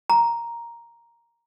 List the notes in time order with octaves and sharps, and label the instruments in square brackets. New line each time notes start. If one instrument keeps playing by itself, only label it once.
[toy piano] A#5